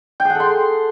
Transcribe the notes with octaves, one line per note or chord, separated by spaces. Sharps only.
G5
G#4
F#5
A4
C6